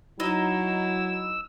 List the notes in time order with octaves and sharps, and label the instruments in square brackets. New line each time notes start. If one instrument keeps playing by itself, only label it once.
[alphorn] F#3 [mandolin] D#4 [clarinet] E4 [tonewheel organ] E6